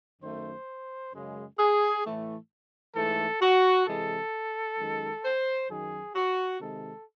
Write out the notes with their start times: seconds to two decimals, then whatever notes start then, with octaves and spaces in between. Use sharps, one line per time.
0.21 F#2 D#3 A3 C5
1.13 F#2 C#3 G#3
1.59 G#4
2.05 A2 E3 A3
2.95 G#2 E3 A3 A4
3.41 F#4
3.87 C3 E3 G#3 A4
4.78 F#2 D#3 G#3
5.24 C5
5.69 F#2 D#3 F#3 G#4
6.15 F#4
6.60 C3 D#3 G#3 A4